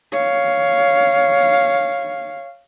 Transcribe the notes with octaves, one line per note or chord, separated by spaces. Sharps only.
C#5 F5